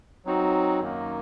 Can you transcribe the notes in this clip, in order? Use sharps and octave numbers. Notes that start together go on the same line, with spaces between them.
F#3 C4 D#4 F#4
F#2 D#3 A#3